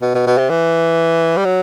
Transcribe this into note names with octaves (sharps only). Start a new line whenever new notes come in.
B2
B2
B2
C3
E3
G3
F#3